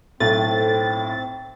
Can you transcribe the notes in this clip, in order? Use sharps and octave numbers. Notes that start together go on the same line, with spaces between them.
B1 A2 C4 A4 A6